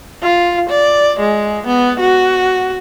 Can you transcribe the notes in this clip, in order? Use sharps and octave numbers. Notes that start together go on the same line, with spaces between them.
F4
D5
G#3
B3
F#4